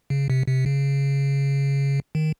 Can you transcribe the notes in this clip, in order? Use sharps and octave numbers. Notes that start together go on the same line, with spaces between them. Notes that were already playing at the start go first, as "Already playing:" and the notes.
C#3
C3
C3
C#3
D#3